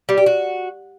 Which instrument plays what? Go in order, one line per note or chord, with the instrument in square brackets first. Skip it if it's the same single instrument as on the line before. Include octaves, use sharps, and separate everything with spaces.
[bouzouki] G3
G4
F#4